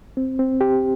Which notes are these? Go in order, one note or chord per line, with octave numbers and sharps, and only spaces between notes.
C4
C4
G4